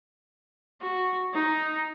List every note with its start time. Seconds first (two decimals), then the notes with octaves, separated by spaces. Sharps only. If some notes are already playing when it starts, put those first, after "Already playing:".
0.81 F#4
1.34 D#4